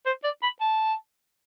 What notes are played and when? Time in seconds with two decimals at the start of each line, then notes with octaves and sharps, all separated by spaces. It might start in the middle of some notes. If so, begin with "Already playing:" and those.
0.06 C5
0.24 D5
0.43 B5
0.60 A5